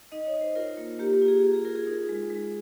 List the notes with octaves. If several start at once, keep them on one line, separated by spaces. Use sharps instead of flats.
D#4 D#5
C#5
D#4
C5
F4 A#4
A#3
A#3 G4
G4
F4
G#4
F4 G#4
G#4
F4 A#4
G#4
D#4
G#3
G#3